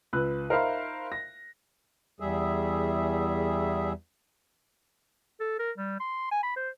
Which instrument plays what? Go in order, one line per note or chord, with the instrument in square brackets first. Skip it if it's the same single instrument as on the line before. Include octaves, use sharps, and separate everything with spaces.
[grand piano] C#2 B4 E6 F#6
D#4 A#4 C5 E5 F5 B5
A#6
[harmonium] E2 G3 G#4 E5
[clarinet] A4
A#4
G3
C6
G#5
B5
C5